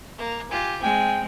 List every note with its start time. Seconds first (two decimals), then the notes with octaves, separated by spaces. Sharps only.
0.18 A#3
0.51 F4 G4 G#5
0.83 G#3 C4 G5 G#5